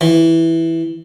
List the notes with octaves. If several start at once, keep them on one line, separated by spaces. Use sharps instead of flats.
E3